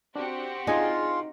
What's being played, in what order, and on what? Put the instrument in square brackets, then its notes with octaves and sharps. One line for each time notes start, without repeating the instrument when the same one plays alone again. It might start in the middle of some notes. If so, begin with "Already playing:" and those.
[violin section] C4 F#4 G4 [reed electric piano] D4
[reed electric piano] D4 G#4 G#5 [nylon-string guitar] D#4 [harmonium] F4